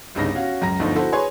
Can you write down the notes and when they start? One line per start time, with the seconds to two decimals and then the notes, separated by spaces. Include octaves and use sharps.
0.15 G1 C2 G2 C#3 D#4 A#6
0.35 C#4 F#4 F5
0.61 C#2 F#2 A#5 A#6
0.79 G1 D2 D3 F3 D#4
0.96 E4 F#4 A4 C5
1.12 G#4 B4 C#5 G#5 C6